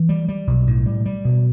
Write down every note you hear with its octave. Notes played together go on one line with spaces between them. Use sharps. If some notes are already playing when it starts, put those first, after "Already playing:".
Already playing: E3
G3
G3
B1
A2
G3
G3
B2